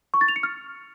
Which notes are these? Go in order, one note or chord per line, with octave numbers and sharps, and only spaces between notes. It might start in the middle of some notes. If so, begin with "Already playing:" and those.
C#6
A6
F7
C#7
F6